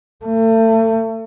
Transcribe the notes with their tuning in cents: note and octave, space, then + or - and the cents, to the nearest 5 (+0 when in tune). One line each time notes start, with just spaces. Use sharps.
A3 +35